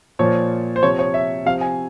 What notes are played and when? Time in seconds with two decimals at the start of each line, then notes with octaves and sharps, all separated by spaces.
0.19 A#2 F3 C#5
0.76 C5
0.83 C3 F3 C#5
0.99 C#5
1.14 E5
1.46 C3 F3 F5
1.61 G#5